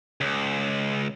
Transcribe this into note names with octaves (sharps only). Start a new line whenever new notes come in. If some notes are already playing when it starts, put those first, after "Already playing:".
C#2